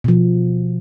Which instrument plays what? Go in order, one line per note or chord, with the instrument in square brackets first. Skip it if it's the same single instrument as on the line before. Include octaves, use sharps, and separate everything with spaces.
[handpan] B2 F3